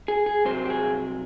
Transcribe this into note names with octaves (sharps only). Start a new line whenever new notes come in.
G#4
G#4
C2 C3 F#3 C5
G4
G#4